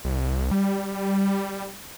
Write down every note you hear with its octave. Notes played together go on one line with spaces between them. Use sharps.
C2
G3